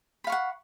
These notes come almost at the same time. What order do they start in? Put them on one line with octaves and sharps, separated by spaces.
B5 F5 C#6 F#5